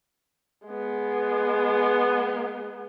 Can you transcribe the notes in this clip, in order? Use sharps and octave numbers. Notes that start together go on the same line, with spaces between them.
G#3 B3